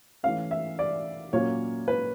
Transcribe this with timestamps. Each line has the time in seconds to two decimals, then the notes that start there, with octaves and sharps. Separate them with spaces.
0.23 E3 A3 C#4 F5
0.51 E5
0.79 D5
1.33 A#2 F#3 A#3 C#4 C#5
1.88 B4